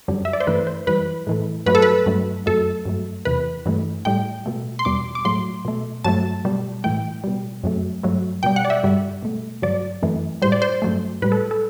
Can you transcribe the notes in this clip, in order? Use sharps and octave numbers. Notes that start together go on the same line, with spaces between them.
F#2 D3 G3
E5
D5
C5
G2 E3 A3 B4
C5
F#2 E3 G3 B4
A2 E3 A3
G2 F#3 A3 B4
A4
B4
G2 F#3 A3
F#2 F#3 A3 A4
G2 F#3 A3
E2 C3 E3 B4
G2 E3 A3
A2 G3 G5
B2 A3
C6
E2 B2 G3 D6
D6
A2 F#3 A3 C6
B2 A3
G2 F#3 A3 A5
B2 G3
A2 E3 A3 G5
B2 G3
F#2 F#3 A3
G2 F#3 A3
B2 G3 G5
F#5
D5
E5
G2 D3 G3
B2 A3
G2 D3 F#3 D5
F#2 E3 A3
A2 G3 C5
D5
C5
G2 F#3 A3
A2 G3 B4
A4
A4